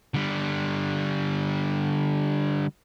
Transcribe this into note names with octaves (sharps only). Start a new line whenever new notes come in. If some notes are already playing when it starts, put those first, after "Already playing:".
D3 G3